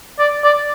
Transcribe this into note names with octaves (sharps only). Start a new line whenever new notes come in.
D5
D5